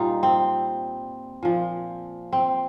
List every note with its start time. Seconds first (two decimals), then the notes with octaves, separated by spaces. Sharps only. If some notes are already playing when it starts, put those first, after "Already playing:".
Already playing: A#2 G3 D#4 F4
0.23 C4
1.43 A#2 F3
2.33 C4